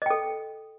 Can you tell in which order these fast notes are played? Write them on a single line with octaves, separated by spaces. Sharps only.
D#5 G5 A4